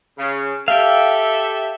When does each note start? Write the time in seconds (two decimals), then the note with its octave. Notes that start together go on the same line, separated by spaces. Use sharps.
0.18 C#3
0.68 G4 A4 E5 F5 G5